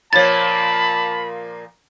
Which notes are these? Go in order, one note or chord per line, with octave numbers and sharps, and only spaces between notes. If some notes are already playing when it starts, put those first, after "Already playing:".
A#2 F3 A#3 C#5 A5 B5 A6